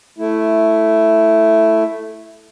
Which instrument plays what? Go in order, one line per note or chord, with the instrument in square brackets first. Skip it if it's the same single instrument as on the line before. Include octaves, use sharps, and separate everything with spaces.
[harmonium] A3 E4